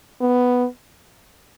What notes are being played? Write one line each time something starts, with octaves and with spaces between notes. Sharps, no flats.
B3